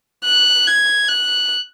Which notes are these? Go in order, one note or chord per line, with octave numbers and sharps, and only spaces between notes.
F#6
G#6
F#6